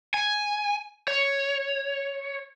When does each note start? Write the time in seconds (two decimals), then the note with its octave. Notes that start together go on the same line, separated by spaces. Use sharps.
0.14 G#5
1.08 C#5